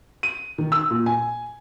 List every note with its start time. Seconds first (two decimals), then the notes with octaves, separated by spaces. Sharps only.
0.23 D#7
0.58 D#3
0.72 E6
0.90 A#2
1.06 G#5